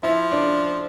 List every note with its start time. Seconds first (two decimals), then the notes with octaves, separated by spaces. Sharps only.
0.03 F3 E4
0.31 D4